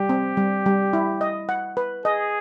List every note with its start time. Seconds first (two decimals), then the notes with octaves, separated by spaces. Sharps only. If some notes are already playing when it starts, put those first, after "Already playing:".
Already playing: G3 G4
0.09 C4
0.37 G3
0.66 G3
0.93 E4
1.21 D#5
1.49 F#5
1.77 B4
2.05 G#4 D#5